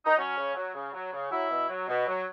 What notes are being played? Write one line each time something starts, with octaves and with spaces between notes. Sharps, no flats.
D#4
F#3 C#4
C#3
F#3
C#3
F#3
C#3
F#3 E4
B2
F#3
B2
F#3